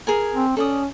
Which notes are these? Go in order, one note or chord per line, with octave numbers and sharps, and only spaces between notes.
G#4 A#4 G#5
C4
C#4 A4 D5 D#6